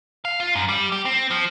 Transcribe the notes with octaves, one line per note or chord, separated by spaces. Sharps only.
F5
F4
F#2
G3
G4
C4
F3